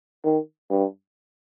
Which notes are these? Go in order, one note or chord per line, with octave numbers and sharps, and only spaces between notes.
D#3
G2